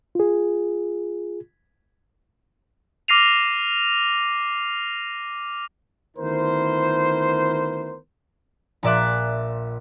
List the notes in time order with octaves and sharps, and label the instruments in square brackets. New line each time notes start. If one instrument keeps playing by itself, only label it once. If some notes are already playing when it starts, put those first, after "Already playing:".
[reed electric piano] F4 G#4
[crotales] D6 F6 A#6 C7 D#7 F7
[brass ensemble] D2 D#3 B3 E4 A#4 C5
[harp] A#1 A#2 D5 E5 D6 F#6